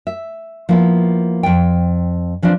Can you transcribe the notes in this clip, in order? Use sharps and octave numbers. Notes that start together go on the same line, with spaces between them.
E5
F3 A#3 B3 E4
F2 G5
E3 F3 C4 D4